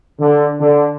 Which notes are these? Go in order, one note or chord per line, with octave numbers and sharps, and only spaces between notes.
D3
D3